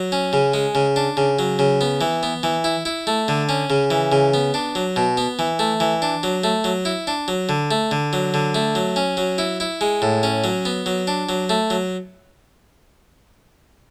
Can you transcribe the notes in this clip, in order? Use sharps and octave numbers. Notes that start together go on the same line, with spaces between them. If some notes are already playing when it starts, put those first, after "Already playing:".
Already playing: F#3
C#4
C#3
G#3
C#3
D4
C#3
F#3
C#3
B3
E3
B3
E3
E4
E4
A3
D3
C#4
C#3
E3
C#3
B3
D4
F#3
B2
B3
E3
A3
E3
D4
F#3
A3
F#3
E4
D4
F#3
D3
A3
D3
F#3
D3
A3
F#3
C#4
F#3
E4
E4
G#3
A2
C#4
F#3
B3
F#3
D4
F#3
A3
F#3